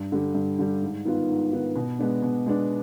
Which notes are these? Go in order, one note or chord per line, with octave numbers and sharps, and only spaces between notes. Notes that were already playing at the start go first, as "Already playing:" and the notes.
Already playing: G2
D3 G3
G2
D3 G3
G#2
D#3 B3 F4
G#2
D#3 B3 F4
B2
G#3 B3 D4
B2
G#3 B3 D4